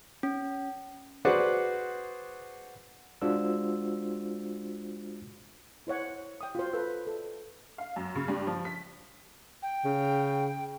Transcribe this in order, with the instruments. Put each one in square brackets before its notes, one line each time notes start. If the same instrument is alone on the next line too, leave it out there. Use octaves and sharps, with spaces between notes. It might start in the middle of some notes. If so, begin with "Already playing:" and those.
[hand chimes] C#4
[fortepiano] F#4 G#4 B4 C5 D5 F#5
[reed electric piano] G#3 D4 F4 F#4 C5 E6
[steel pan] E4 C5 C#5 F#5
G5 D#6
F4 F#4 C5
A4 B4 E6
A4
[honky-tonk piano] F5
F#2
C#3
G2
F3
B6
[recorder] G5
[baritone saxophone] C#3